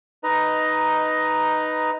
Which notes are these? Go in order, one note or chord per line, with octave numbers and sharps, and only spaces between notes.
D#4 B4 D#5 A#5